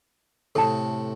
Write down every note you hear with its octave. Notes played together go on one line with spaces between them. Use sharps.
A2 C3 A4 A5